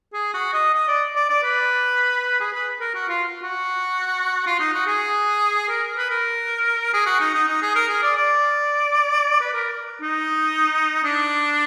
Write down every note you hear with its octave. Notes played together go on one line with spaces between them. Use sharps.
G#4
F#4
D#5
D#5
D5
D5
D5
B4
G#4
B4
A#4
F#4
F4
F#4
F4
D#4
F#4
G#4
A#4
B4
A#4
G#4
F#4
D#4
D#4
D#4
G#4
A#4
G#4
D5
D5
B4
A#4
D#4
D4